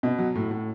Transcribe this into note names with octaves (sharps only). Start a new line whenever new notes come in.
B2
F#3
A2
A2